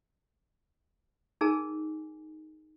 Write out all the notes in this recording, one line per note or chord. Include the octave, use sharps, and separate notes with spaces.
D#4 G#4 A#4 G#5 A5